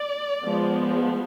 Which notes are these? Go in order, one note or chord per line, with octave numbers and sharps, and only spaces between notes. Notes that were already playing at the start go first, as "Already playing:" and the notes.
Already playing: D5
F3 G#3 B3